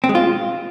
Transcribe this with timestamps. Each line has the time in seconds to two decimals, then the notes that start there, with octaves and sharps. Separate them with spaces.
0.04 C4
0.09 G#3
0.15 F4